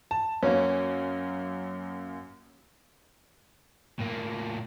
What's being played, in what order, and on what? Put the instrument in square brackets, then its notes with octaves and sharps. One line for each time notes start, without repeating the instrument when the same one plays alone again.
[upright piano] A5
[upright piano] F#2 A#3 [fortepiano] C#4
[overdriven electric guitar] A2 A#3